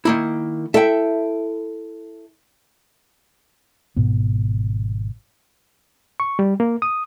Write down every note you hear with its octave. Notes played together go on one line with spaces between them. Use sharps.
D#3 A#3 E4
E4 A4 E5 G5
G#1 G#2 B2 B3
C#6
G3
A#3
D#6